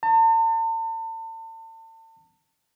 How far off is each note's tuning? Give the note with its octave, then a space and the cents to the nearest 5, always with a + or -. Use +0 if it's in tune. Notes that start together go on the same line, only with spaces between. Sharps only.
A5 +40